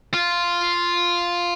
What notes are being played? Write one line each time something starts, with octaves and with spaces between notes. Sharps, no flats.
F4